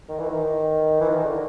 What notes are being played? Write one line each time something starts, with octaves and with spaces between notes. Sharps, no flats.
D#3
E3
D#3
E3
D#3
D3